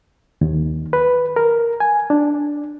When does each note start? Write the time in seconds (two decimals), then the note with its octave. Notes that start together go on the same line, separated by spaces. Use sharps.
0.41 D#2
0.93 B4
1.36 A#4
1.80 G#5
2.10 D4